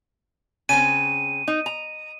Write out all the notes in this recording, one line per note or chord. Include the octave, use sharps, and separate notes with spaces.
C#3 C4 D#7
D#4
A#5